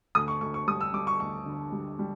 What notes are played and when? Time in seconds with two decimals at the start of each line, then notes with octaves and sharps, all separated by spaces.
0.15 D2 D#6
0.28 C#6
0.41 D2 C#6
0.54 C#6
0.68 G3 D#6
0.81 E6
0.94 G3 D6
1.07 C#6
1.20 D2 C#6
1.46 D3
1.72 G3
1.99 G3